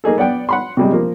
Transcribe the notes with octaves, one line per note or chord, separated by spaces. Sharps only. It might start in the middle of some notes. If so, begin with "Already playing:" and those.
A#3 D#4 G#4 A4
B3 D5 F#5 G5
F#5 B5 C6
C3 G3 G#3
F3 A#3